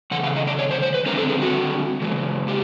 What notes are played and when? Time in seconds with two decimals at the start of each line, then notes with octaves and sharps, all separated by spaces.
0.11 C#3 E3 F#5
0.24 F5
0.36 D#5
0.47 D5
0.59 C#5
0.71 C5
0.82 C5
0.94 B4
1.06 D3 G3 C4 A#4
1.18 A4
1.29 G#4
1.42 F#4
2.01 C#3 E3 G#3
2.48 G4